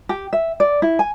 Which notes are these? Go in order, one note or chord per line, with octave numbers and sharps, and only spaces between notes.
G4
E5
D5
E4
G#5